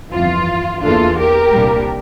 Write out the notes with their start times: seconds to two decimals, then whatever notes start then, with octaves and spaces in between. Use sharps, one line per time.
0.11 G1 F2 E3 F4
0.82 E2 E3 A#3 D4 F4 A4
1.18 G4 A#4
1.54 C2 A#2 G3 A#3 D4